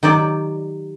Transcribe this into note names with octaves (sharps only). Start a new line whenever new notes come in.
D#3 F#3 G4 D5